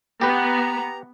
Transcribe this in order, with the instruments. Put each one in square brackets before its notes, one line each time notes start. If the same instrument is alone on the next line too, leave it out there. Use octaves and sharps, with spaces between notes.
[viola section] B3 [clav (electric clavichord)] G4 B4 [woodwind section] A#5